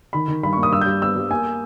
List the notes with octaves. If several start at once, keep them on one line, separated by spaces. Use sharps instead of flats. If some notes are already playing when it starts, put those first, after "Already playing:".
D#3 B5
D#3
G2 B5
C#6
A#3
D#6
G2 E6
G6
G3
B3 E6
G3
A#3 G#5